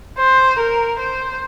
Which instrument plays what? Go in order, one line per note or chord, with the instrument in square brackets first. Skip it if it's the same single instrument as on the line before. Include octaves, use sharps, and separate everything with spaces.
[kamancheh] C5
A#4
C5